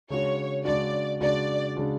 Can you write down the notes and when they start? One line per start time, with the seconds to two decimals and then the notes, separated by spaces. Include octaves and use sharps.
0.10 C#3 G#3 D4 F#4 C#5
0.65 C#3 G#3 D4 F#4 D5
1.21 C#3 G#3 D4 F#4 D5
1.76 C#3 G#3 D4 F#4